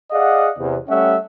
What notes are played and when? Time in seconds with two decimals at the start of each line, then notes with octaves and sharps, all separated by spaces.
0.11 G#4 D5 D#5 F5 F#5
0.58 E2 C3
0.88 G3 A3 C#4 C#5 E5 F#5